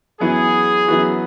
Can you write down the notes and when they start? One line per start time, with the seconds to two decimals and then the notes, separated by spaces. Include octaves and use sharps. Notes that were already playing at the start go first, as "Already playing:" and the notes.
0.20 F#2 E3 B3 F#4 G#4
0.88 F#2 E3 B3 F#4